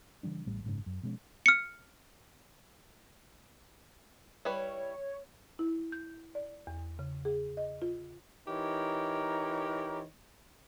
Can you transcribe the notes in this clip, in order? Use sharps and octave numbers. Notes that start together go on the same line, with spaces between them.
C#3 E3 G3 D4
A1 A2 G3
F#1 G#2 C#3
F#2
B2 F3 G#3 C#4
F6 C#7
G3 E4 B4 C#5
E4
G6
D5
E2
C#3
G#4
D#5
F4
E3 D#4 G4 A#4 C#5